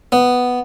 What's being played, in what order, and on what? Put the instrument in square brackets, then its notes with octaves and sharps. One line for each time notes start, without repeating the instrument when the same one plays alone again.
[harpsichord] B3